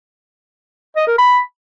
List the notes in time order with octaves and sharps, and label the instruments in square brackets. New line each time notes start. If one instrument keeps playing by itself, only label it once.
[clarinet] D#5
A#4
B5